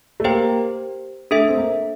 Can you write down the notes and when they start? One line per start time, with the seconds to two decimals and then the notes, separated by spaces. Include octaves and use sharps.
0.20 A3
0.24 A#3 G4 C5 G5
1.31 A3 D4 A4 E5
1.49 C4
1.57 A#3